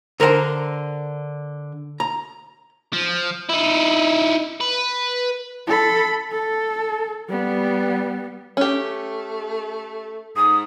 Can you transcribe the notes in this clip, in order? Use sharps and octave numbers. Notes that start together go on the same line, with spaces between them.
D3 A#4 C5 F#5 A#5
A#5
F3
D#4 E4
B4
A4 B5
A4
G3 B3
A3 C#4 G4
G#2 D#6